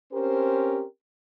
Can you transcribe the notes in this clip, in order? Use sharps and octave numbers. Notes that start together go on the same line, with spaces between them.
C4 C#4 G4 A#4 C5